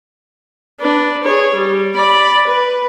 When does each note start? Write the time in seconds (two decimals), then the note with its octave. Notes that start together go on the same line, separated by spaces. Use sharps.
0.81 D4 B4
1.24 G#4 C#5
1.54 G3
1.95 D5 B5
2.47 B4